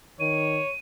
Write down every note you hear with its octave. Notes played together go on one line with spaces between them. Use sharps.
D#3 C#5 D#7